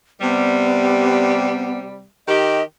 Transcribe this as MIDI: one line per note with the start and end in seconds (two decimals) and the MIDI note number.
0.21 2.04 48
0.21 2.04 55
0.21 1.77 59
2.28 2.62 51
2.28 2.62 67
2.28 2.63 75